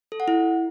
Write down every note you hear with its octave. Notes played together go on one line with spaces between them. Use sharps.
A4
F#5
E4